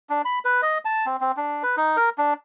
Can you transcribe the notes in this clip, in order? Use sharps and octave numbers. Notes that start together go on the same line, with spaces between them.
D4
B5
B4
D#5
A5
C4
C4
D4
B4
D#4
A#4
D4